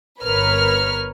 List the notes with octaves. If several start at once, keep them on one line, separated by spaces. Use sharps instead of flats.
G1 A#4 B4 C#5 F6